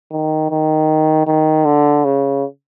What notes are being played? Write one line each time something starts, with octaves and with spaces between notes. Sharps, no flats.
D#3
D#3
D#3
D3
C#3